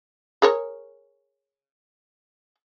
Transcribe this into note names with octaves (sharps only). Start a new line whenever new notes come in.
G#4 A#4 C#5